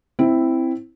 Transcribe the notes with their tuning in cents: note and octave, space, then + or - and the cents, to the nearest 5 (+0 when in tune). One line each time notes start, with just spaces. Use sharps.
C4 +0 E4 +0